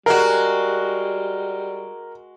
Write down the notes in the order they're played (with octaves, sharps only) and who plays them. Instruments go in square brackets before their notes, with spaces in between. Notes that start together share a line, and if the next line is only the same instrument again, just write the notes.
[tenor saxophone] G3 [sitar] G#3 F#4 [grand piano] A#4